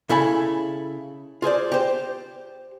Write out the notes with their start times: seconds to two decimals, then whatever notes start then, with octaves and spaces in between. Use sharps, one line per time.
0.09 C#3 E4 A4 C#5 G#5 B5
1.42 F4 G#4 C5 D5
1.72 G4 C5